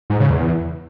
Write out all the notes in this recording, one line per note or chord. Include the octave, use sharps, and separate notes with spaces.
G#2
C#3
E2